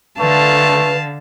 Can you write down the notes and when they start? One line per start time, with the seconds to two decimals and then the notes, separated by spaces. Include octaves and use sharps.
0.20 D3 A3 B4 F5 A5